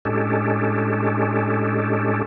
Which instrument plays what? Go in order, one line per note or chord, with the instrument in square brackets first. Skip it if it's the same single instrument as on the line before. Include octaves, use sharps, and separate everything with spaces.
[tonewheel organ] A2 G#3 C#4 D4 G4 A4